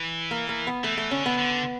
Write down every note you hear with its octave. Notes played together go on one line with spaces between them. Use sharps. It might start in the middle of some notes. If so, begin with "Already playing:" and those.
Already playing: E3
A#3
A#3
B3
E3 A3
A3
D3 C#4
B3
D3